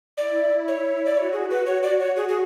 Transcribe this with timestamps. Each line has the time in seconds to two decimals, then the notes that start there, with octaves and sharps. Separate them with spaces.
0.17 E4 D5
0.68 C#5
1.06 D5
1.17 F#4 C#5
1.33 G#4
1.51 B4
1.66 C#5
1.83 D5
2.00 C#5
2.17 G#4
2.29 G#4